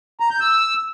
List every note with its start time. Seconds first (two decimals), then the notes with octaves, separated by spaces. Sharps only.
0.20 A#5
0.30 G6
0.40 E6